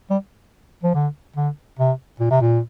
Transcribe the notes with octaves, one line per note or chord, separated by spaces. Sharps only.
G3
F3
D3
D3
C3
A#2
C3
A#2